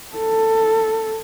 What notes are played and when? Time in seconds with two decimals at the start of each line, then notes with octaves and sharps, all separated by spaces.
0.17 A4